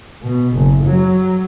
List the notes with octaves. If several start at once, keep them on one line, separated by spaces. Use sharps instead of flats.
B2
F#1
F#3